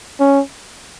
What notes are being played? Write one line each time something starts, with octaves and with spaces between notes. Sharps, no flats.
C#4